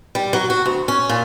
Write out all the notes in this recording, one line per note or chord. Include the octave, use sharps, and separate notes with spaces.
G3
F#3
F#4
D2
C#4
A#2